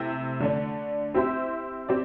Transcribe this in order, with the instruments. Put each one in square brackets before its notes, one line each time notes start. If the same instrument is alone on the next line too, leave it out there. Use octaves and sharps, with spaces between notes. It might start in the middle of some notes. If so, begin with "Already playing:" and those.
Already playing: [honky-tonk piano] C3 A3 C4 E4
D3 A3 D4
C4 E4 G4 C5 E5
C4 G4 D5